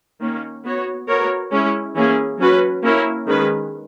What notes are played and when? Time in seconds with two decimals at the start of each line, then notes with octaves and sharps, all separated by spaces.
0.21 D#3 A#3 C#4
0.64 B3 F#4 C#5
1.08 B3 F#4 A#4 C#5
1.52 G#3 C#4 E4
1.96 E3 A#3 C#4 G#4
2.39 F#3 C#4 F#4 B4
2.83 A#3 C#4 E4 A#4
3.27 D#3 G#3 C#4 G#4 B4